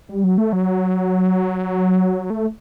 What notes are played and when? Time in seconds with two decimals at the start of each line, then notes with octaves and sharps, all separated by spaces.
0.09 G3
0.24 F#3
0.38 A3
0.53 F#3
2.30 A3